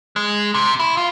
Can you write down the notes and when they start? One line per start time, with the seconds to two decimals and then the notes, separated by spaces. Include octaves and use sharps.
0.16 G#3
0.54 C3
0.79 E4
0.97 F4